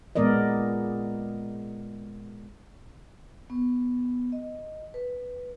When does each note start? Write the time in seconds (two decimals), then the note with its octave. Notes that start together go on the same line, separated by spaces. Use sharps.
0.16 A#2 G#3 B3 A#4 D5 D#5
3.50 B3
4.32 D#5
4.94 B4